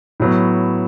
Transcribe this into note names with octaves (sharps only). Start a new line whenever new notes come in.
A2 F#3 B3